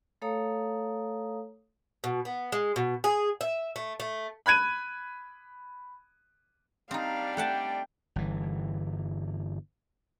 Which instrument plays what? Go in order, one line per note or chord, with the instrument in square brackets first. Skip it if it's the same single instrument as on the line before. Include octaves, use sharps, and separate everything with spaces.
[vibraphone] A3 A4 C#5 F5 A#5 D#6
[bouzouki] B2
B3
G#3
B2
G#4
E5
A3
A3
[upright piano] B5 F#6 G#6 D#7
[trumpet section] G3 D4 [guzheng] C4 D#4 [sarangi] F5
[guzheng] A3 F#5 A5 [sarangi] G5
[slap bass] G1 E3